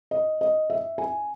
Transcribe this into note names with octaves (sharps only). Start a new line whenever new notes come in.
D#5
D#5
E5
G#5